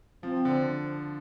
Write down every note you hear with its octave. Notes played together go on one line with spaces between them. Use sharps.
F3 C4
D3